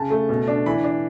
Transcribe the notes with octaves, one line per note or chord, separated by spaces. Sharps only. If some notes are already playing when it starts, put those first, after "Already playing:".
Already playing: C#3 A5
A3
B2
D4
E3 B5
D4